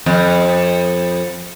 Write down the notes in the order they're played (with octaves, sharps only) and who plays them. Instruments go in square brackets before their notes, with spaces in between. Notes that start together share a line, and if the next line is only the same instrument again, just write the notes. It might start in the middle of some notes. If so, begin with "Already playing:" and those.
[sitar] F2